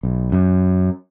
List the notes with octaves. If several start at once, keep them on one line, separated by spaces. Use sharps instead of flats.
B1
F#2